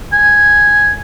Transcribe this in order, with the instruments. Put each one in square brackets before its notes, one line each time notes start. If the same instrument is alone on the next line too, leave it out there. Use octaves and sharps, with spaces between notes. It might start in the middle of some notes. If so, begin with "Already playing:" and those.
[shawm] G#5